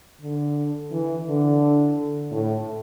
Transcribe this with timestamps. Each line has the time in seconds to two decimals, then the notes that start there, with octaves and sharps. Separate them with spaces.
0.21 D3
0.91 E3
1.26 D3
2.31 A2